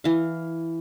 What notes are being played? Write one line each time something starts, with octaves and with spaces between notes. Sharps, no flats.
E3 F5